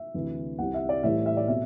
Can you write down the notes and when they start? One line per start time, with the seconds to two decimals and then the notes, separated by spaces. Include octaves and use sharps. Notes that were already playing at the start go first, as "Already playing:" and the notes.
Already playing: E5
0.14 D2 C3 E3
0.58 C2 C3 G3 C4 F#5
0.74 E5
0.89 D5
1.03 A2 E3 G3 E5
1.26 E5
1.37 D5
1.48 B2 A3 C4 E5